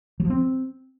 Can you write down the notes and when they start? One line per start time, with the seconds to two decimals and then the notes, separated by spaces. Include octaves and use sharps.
0.20 F#3
0.25 F3
0.30 C4